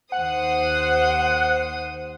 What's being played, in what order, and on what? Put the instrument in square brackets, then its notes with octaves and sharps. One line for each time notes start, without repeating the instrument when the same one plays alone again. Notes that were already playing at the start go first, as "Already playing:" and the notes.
[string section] D#2 C5 D#6 [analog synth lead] F#5